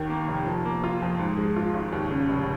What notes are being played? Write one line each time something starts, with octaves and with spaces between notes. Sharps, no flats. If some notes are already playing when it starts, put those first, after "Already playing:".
Already playing: D#2 D#3
A#3
F1
F3
A#3
F4
F2
G#2
G#3
F4
G#1
D#2
C#3
F1